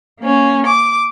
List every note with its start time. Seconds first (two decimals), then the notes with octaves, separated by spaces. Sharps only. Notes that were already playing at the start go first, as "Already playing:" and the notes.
0.20 A#3 C#4
0.65 D6